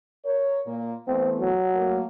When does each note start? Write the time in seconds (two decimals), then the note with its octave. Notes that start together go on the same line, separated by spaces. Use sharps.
0.25 A#4 C#5
0.67 A#2 A#3
1.08 E3 A3 B3 C4
1.40 F#3
1.74 A3 A#3